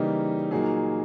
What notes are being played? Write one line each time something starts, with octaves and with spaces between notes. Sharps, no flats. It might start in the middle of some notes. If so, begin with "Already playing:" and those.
Already playing: C#3 E3 G3 A#3 D#4
A#2 F#3 A#3 D#4 G#4